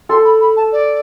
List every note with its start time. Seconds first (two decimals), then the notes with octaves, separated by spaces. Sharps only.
0.09 A4 C6
0.25 B5
0.41 B5
0.57 A5
0.72 D5